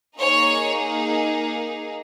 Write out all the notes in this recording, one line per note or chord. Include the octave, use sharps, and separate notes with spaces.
A#3 D#4 G#4 C#5